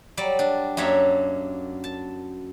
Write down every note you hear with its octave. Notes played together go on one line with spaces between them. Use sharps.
F#3 G3 D5
D4
F#2 A#3 D4 C#5 E5
A5